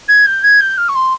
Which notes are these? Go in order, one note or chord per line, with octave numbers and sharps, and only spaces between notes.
G#6
G6
G#6
G6
F6
C#6
C6